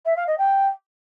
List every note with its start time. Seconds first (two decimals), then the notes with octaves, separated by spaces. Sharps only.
0.05 E5
0.16 F5
0.27 D#5
0.38 G5